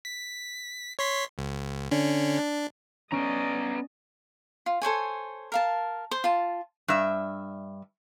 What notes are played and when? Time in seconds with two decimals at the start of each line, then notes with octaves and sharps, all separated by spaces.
0.05 B6
0.99 C#5 C6 B6
1.38 C#2
1.91 D3 C#4 D4
2.39 D4
3.12 B3 C#4 B4 D5 D#5 A#5
4.66 F4
4.82 A4 C5 C#5 G#5
5.52 A#4 F5 A5
6.11 C5
6.24 F4 A5
6.88 G2 E5